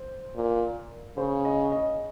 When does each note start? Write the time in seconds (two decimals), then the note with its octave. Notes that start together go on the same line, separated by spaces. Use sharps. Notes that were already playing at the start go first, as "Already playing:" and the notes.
Already playing: C5
0.36 A#2
1.17 C#3 C5
1.45 D#5
1.72 D#5